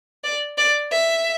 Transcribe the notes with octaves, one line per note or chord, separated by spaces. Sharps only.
D5
D5
E5